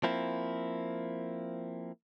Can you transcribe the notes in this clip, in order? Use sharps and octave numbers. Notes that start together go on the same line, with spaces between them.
F3 A#3 C4 E4